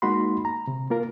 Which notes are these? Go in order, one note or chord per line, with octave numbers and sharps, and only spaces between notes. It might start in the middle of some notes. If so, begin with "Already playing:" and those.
G#3 A#3 D#4 F#4 B5 C6
A#5
C3
A#3 F4 A#4